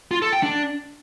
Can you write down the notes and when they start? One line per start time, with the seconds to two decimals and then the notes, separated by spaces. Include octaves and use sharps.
0.11 F4
0.22 A4
0.32 G5
0.43 D4